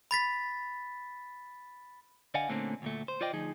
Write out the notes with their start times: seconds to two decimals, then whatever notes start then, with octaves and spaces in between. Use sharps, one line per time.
0.11 B5 A6 B6
2.34 D3 D5 D#5 F5 F#5 G#5
2.49 A#2 D3 A3 A#3 C4 C#4
2.82 D2 A#2 A3
3.08 C5
3.21 F4 C5 D5 D#5 G5
3.33 D2 F3 D#4 G#4